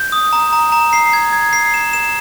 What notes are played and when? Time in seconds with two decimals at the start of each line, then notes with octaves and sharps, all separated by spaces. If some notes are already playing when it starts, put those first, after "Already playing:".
Already playing: G6
0.12 D#6
0.33 A#5
0.53 A#5
0.72 A#5
0.93 C7
1.13 G#6
1.33 G#6
1.53 C7
1.74 E7
1.93 E7